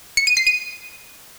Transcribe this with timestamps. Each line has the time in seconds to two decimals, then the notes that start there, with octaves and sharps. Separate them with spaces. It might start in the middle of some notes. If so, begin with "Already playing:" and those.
0.17 C#7
0.27 D#7
0.37 C7
0.47 D#7